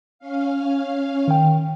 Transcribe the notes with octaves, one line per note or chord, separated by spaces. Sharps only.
C#4 F5
D#3 G5